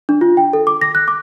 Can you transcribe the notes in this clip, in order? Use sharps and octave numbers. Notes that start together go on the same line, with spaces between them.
D4
F4
G5
A4
D6
A#6
F#6
D6